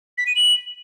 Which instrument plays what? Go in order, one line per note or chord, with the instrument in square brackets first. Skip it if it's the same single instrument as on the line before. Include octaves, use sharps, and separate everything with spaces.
[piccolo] B6
D#7
F#7